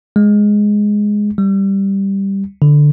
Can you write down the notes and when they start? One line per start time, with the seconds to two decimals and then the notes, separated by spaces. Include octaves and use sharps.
0.16 G#3
1.38 G3
2.62 D3